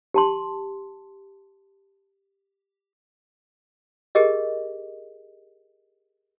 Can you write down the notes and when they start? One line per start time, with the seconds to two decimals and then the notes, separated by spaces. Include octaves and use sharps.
0.14 G4 A5 C6
4.15 G4 G#4 A#4 D#5